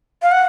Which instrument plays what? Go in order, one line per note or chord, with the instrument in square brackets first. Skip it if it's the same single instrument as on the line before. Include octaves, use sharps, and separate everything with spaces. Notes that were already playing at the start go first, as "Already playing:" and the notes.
[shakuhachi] F5
F#5